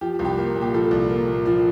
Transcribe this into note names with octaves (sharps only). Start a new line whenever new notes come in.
F3 G4
C2
G4
A#3
A#2
G4
F3 A4
C2
A#3
A#2
F3